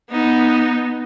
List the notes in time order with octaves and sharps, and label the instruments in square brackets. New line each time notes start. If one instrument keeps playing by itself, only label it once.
[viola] B3 D#4